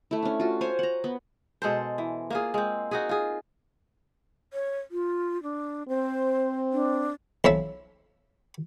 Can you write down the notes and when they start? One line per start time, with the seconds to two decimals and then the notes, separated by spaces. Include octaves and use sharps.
0.11 A3 E4
0.23 C#4 D4
0.40 F4 F#4
0.61 C5 C#5 G#5
0.79 F#5 A#5
1.04 B3
1.62 B2 G#3 A4 C5
1.98 E3
2.30 A#3 F4 G#4
2.54 G#3 C4
2.91 D#4 F#4 G#4
3.09 F4 G#4
4.53 C#5
4.91 F4
5.43 D4
5.89 C4 C5
6.73 D4
7.44 B1 F3 F#3 E5